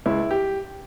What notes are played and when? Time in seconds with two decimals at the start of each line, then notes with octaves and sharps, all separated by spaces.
0.06 C#2 E4
0.31 G4